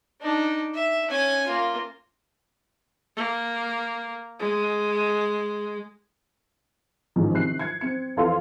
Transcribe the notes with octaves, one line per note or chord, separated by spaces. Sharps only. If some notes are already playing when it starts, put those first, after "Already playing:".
D4 D#4
E5
C#4 G#5
A#3 F4
A#3
G#3
A1 G#2 D#3 F3
C3 D#3 F#6 C7
G#6 C#7
C4 C#7
F2 E3 A4 F5 C6